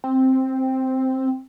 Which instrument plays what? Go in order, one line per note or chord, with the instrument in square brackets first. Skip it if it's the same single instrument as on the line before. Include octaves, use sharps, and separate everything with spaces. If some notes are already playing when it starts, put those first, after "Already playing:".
[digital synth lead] C4